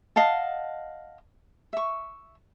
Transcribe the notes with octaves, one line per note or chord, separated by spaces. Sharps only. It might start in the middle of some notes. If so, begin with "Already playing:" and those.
D#5 F5 F#5 A5
E5 C#6